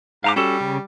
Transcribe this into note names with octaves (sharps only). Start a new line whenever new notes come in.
G#2 F5 A#5 D6
G3 C#4 F#4 A4
C#3